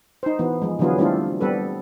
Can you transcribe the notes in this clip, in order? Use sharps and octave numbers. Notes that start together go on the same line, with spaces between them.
D#4 C5
E3 B3
F3 G#3
D3 E3 F#3 B3 F4 G#4
G3 A3 C4 D4 E4 F4
G3 B3 C4 A4 B4